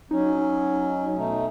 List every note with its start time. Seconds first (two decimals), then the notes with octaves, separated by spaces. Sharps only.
0.11 F#3 C#4 D#4
1.16 B2 A3 D#4